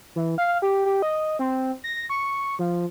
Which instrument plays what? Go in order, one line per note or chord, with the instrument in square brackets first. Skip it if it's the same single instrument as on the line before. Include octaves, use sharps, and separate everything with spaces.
[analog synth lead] E3
F5
G4
G4
D#5
C4
A#6
C#6
F3